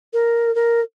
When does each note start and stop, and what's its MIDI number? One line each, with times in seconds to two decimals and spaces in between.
0.13 0.53 70
0.55 0.80 70